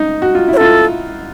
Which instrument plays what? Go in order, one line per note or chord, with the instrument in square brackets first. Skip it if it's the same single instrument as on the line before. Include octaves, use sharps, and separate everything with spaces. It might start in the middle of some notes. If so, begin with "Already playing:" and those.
Already playing: [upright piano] D#4
F#4
F4
E4
[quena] C#5
[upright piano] F4 [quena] A4